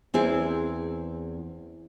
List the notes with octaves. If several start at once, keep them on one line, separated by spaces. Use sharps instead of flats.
E2 C4 E4 G#4